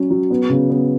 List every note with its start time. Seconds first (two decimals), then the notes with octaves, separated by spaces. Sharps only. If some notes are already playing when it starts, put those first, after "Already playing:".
Already playing: F#3 C#4
0.10 F#3
0.30 B3
0.50 C#3
0.70 B3